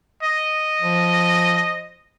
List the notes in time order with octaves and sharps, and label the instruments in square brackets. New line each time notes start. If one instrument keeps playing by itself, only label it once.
[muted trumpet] D#5
[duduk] F3